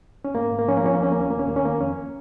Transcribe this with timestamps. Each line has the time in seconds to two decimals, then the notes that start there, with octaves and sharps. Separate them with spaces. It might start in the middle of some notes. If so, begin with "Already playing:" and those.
0.25 C#4
0.35 G#2 A#3
0.52 G#2
0.59 A#3
0.68 F3 C#4
0.77 A#3
0.83 F3 C#4
0.95 A#3
1.00 D#2 C#4
1.12 A#3
1.16 D#2 C#4
1.31 D#2 A#3
1.39 C#4
1.48 D#2 A#3
1.56 C#4
1.64 D#3 A#3
1.80 F2 C#4